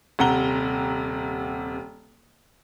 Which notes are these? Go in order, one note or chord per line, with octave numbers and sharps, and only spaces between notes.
D#1 C3 F#5 A#5 G7